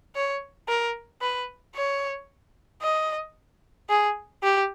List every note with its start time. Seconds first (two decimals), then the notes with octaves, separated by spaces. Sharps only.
0.15 C#5
0.68 A#4
1.22 B4
1.75 C#5
2.82 D#5
3.89 G#4
4.43 G4